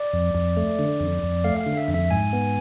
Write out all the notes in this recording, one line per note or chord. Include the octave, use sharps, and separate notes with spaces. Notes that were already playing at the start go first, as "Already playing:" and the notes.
Already playing: D5
F2
F2
A3
D3
F2
F2
A3 F5
F5
D3
E5
F2
E5
G#2 G#5
B3